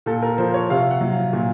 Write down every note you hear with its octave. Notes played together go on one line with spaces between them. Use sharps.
A#2 A4
A#4
F3 C5
C#5
C3 F5
F#5
F#3
F5
A#2